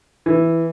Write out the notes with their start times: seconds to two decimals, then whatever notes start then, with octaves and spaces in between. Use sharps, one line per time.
0.26 E3